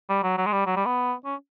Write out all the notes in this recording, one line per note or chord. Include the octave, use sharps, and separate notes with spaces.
G3
F#3
F#3
G#3
G3
F#3
G3
B3
C#4